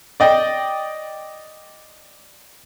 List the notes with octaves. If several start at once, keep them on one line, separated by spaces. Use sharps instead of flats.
D5 D#5 G5